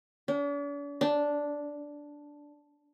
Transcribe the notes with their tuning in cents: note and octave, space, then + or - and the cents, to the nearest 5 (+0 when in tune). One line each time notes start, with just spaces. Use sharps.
D4 -45
D4 -5